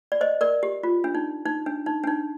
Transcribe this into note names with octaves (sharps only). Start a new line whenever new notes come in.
D5
C5 D#5
A#4 D5
G4
F4
D4
D#4
D#4
D4
D#4
D4
D#4